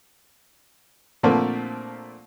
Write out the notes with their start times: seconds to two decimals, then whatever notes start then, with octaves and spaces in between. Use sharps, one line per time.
1.23 A#2 D3 F3 A3 A#3 C4